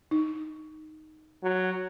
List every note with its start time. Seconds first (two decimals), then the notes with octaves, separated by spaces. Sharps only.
0.11 D#4
1.43 F#3